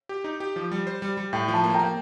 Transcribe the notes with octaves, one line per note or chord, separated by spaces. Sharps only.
G4
D#4
G4
F3
G3
C5
G3
G3
A2 G5
F3
A5
A#3
G5 A#5
A#3